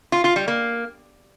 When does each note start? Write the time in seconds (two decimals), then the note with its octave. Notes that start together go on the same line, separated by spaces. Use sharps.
0.12 F4
0.24 F4
0.36 G3
0.48 A#3